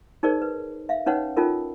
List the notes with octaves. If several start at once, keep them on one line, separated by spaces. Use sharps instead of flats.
D#4 G#4 A#4 C5 D5
B4
E5 F5
C#4 D#4 B4 C#5 F#5
C#4 D#4 F4 A4 A#4